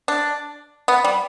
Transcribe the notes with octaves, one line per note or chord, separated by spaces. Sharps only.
D4
B3
G3